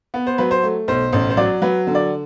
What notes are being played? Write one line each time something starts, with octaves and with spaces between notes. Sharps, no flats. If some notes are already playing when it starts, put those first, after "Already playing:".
B3
C5
F#3 B4
C5
A3
B1 C5
A1 C5
C5
F#3 D5
F#3 B4
D3
D5